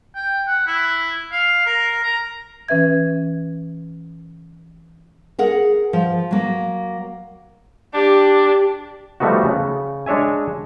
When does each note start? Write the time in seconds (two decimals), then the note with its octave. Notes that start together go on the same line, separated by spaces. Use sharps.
0.16 G5
0.47 F#5
0.67 E4
1.32 F5
1.66 A#4
2.03 A#5
2.68 E3 C#4 B4 E5 G#6
5.39 G#4 A#4 F#5
5.93 F3
6.31 F#3 A#3
7.94 D4 G4
9.20 F3 G3 A3 B3 D#4 F#4
9.45 C#3
10.06 G#3 D4 C#5 E5 G#5